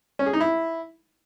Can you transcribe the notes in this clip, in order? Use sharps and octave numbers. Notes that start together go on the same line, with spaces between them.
C#4
G#4
D#4
E4